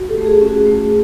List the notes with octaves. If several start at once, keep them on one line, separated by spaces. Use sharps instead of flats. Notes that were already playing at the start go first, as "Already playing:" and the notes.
Already playing: F#4
G4 A4
A3
G#4
C#4 G4
F#4 G#4
A3